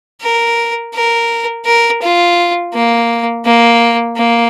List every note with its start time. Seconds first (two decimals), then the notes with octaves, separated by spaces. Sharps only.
0.22 A#4
0.95 A#4
1.66 A#4
2.02 F4
2.74 A#3
3.45 A#3
4.17 A#3